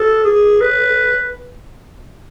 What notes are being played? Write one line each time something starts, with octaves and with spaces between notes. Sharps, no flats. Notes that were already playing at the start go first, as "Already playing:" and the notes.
Already playing: A4
G#4
B4